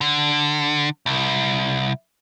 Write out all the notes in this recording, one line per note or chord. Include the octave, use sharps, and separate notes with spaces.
D3
C2